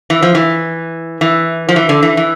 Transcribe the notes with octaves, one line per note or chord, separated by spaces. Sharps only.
E3
F3
E3
E3
F3
E3
D3
E3
E3